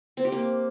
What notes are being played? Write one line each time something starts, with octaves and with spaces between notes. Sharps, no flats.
C4
G4
A#3